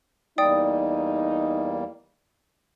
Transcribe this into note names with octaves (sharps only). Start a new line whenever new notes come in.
E2 G3 A#3 D#4 D5 G5 D#6